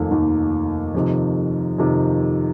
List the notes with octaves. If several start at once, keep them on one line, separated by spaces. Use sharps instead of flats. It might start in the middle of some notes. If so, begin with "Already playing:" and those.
Already playing: F1 D#2 D#3
F1 D#2 D#3
F2 C3 D#3
F2 C3 D#3